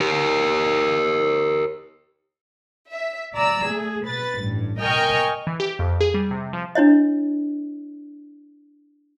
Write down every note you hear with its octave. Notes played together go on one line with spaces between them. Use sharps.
G4 A#4
E5
D5 A#5 E6
A3 G#4
B2 B4 A6
A1 G2
A#4 D#5 G5 G#5 C#6 F6
E3
G4
F2
G#4
G3
C3
F3
D4 E4 C#5 D#5